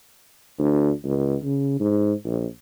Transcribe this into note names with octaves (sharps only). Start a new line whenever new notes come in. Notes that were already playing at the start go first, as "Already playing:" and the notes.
D2
C#2
C#3
G#2
A#1